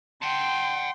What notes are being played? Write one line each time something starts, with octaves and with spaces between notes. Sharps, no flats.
F#5 G5 A5 C6